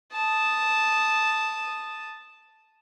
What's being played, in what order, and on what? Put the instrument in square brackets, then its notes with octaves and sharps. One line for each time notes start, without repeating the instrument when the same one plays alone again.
[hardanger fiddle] A5 D#6